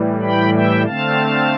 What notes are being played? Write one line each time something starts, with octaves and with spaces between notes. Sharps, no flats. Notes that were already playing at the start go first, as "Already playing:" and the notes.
Already playing: A2 E3 G3
G5 B5
E5 G5
D3 A3 C4 F5 A5